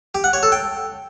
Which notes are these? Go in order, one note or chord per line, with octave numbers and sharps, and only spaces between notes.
G4
F#5
C#5
A4
G5